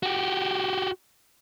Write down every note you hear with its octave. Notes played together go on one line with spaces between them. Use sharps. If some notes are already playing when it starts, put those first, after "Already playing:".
F#4 G4